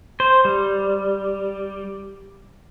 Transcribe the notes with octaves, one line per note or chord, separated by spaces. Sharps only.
C5
G3